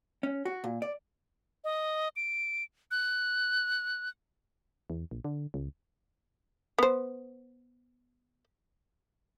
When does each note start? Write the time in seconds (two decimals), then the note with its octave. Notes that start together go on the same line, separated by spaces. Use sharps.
0.23 C#4
0.45 F#4
0.64 A#2
0.82 D5
1.64 D#5
2.16 D7
2.91 F#6
4.90 E2
5.11 A#1
5.25 D3
5.54 C#2
6.79 B3 C5